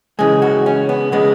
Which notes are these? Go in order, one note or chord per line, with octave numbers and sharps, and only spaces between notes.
C#3 E3 G#3 G#4
F#4
C#4
B3
C#3 G#3 B3